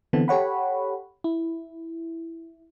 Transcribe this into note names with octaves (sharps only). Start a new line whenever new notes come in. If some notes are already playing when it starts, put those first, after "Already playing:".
D3 E3 B3 C4 A4
G4 A4 C#5 F#5 B5
E4